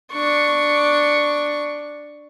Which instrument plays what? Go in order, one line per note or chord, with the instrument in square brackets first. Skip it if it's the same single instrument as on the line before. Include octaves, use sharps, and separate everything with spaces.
[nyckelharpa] D4 C#6